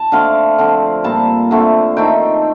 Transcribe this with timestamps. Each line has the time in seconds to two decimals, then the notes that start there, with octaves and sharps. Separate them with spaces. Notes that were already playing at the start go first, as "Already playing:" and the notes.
Already playing: A5
0.12 D3 A3 C4 F5
0.58 D3 F3 C4
1.04 A#2 G3 C4 A5
1.51 D3 A3 C4
1.96 D#3 A3 C4 G5